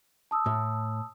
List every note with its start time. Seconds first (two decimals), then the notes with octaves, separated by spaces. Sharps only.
0.31 A5 D#6 E6
0.46 A2